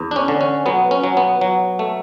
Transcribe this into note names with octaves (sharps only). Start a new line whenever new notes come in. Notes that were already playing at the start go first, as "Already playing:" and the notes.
Already playing: E2
D4
C#4
D3
C#4
F#3 B3
C#4
F#3
B3
F#3
A3